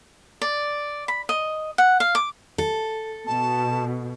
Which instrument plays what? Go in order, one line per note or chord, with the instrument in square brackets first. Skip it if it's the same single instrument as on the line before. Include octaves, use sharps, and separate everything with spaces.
[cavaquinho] D5
B5
D#5
F#5
F5
D6
[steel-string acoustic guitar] A4
[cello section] B2 [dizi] A5